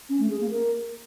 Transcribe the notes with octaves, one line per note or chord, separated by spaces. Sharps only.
C#4
A3
G#4
A#3
A#4